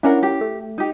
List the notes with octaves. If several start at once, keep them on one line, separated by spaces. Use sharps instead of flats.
C#4 D4 E4 A#4 F#5
G4
A3
D#4 G4